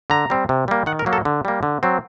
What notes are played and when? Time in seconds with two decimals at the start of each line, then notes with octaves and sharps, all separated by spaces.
0.10 D3 A#5
0.30 G3 C4
0.49 C3
0.68 G3 A#3
0.86 D#3 F#5
0.99 A#4
1.06 F#3 A#3
1.13 A4
1.25 D3
1.45 G3 A#3
1.63 D3
1.83 F#3 C4